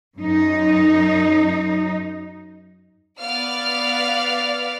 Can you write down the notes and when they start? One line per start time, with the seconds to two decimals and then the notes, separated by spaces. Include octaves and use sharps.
0.17 F#2 D#4
3.20 B3 D5 F5 F6